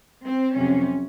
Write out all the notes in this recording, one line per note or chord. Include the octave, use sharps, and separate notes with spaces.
C4
F2 C3 F#3 C#4